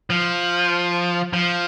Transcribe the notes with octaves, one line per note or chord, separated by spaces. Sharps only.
F3
F3